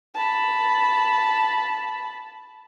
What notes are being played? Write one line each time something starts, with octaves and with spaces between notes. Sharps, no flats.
A5 B5